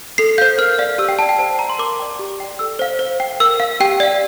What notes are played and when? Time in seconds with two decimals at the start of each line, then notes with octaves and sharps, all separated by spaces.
0.18 A4 C7
0.38 C5 F5 G6
0.58 A#4 F6
0.78 D5 F5
0.98 G4 E6
1.09 G5
1.19 G5 A5
1.22 D5
1.29 G5
1.39 C5 A5
1.59 F5 A#5
1.69 C6
1.79 A#4 D6
1.99 D5 G5
2.19 G4
2.40 D5 G5
2.59 A4 E6
2.79 C5 F5
2.99 C5
3.20 G5
3.40 A#4 E6
3.60 F5
3.80 G4 G5
4.00 D5 F5